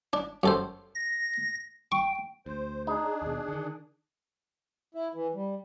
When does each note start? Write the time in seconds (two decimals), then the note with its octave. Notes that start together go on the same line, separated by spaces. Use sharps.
0.13 D4
0.43 F#2 A4 C5
0.95 A#6
1.92 G5 C#6
2.46 D2 C5
2.87 D4 D#4 G#4
3.22 D#2 B2
3.48 D3 D#3
4.95 E4
5.15 E3
5.35 G3